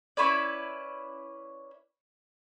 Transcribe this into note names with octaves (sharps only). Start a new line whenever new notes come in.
C#4 E4 B4 D5